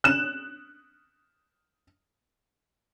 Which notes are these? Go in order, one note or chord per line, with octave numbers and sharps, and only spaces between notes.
F#6 E7